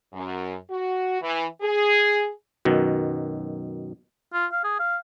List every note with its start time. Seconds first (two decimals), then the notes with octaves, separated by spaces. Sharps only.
0.13 F#2
0.69 F#4
1.21 E3
1.61 G#4
2.65 F#2 B2 D#3
4.33 F4
4.52 F5
4.64 G#4
4.79 F5